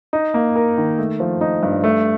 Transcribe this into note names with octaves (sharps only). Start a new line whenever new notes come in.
D#4
A#3
A#4
D#3
A3
F3
D#4
G2
A3